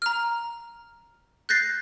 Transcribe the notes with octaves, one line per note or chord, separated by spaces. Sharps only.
A#5 F6
F#6 G6 A6 A#6 C7